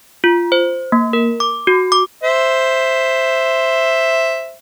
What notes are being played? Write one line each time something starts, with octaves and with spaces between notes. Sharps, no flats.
F4
C5
A#3
A#4
D6
F#4
D6
C5 E5